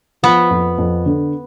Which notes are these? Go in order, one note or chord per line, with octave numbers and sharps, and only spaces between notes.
F3 B3
F2
F2
D3